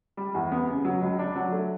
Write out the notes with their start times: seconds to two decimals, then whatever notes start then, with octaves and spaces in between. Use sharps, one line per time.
0.17 G3
0.34 E2
0.51 B3
0.69 C#3
0.85 F#3
1.02 C#2
1.19 D4
1.36 F#3
1.52 A3